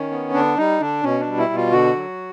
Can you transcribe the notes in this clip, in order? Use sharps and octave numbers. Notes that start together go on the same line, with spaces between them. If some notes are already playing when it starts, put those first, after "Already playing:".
Already playing: D#3 C#4
B3
D3 D4
G3 D#4
D3 D4
B2 C#4
D4
G3
E4
B2
F4
D3 F#4
F#3